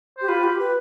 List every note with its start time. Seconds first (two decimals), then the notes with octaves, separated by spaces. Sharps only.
0.17 G4 C5
0.28 F4 B4
0.43 G4
0.59 B4